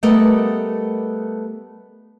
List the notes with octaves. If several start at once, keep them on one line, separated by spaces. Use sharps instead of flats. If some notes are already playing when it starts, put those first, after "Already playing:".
G3 A3 B3 A#4 D#5